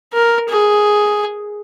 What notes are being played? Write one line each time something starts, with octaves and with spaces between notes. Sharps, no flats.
A#4
G#4